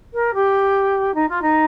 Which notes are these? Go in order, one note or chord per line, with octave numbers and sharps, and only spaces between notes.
A#4
G4
D#4
F4
D#4